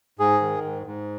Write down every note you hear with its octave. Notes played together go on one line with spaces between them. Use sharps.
G#2 G#4
D#3
G#2
G#2